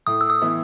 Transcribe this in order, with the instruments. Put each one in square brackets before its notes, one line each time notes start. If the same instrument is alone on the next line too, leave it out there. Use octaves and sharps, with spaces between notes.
[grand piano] A2 [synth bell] D#6
[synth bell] E6
D#6
[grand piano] E3 B3 E4